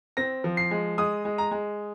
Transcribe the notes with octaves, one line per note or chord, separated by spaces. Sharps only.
C4 A#6
F3
C7
G#3
G#3 D#6
G#3
A#5
G#3